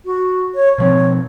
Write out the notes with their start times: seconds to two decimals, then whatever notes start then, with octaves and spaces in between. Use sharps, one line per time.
0.05 F#4
0.55 C#5
0.78 B2 F3 C4 C#5